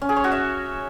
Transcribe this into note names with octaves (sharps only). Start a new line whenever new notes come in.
C#4
G#4
C#5
F#4
E5